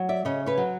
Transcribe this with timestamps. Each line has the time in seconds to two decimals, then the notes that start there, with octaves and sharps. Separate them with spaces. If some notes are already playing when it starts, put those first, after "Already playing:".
Already playing: F#3
0.09 D5 E5
0.25 C#3 C#5 D#5
0.46 B4 C#5
0.58 F#3